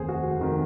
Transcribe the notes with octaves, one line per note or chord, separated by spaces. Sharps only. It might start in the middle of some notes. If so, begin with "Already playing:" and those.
Already playing: F1 D#2 D#3 G#4 C5
F#4
F1 D#3